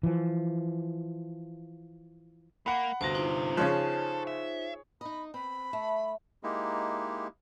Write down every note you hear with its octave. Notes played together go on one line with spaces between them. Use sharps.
E3 F3
A#3 F#5 B5
G1 D2 C3 F#4 C5 A#6
D#4 F4 C5
C#3 F3 G#4 A4 C#5 F#6
E5
D#4 D#5 B5
C4 B5
A3
G#3 A#3 D#4 E4 G4